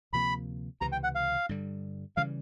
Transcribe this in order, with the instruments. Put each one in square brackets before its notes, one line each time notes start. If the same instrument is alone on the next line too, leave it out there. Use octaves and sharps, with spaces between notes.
[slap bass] D2 C3 F3 A#3 [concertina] B5
[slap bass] C#2 C3 E3 [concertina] A#5
[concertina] G5
F#5
F5
[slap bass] G2 D3 G3
[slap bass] C#3 E3 G3 [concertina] F5